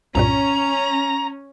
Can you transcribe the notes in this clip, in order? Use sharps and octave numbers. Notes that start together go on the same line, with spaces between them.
C2 G2 A#2 C#4 A#5